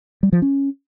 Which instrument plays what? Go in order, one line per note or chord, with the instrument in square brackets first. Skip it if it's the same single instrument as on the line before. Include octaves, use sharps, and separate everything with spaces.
[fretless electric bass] G3
F3
C#4